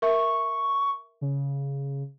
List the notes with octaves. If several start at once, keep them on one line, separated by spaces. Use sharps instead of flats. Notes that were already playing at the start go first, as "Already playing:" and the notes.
A#4 E5 C#6
C#3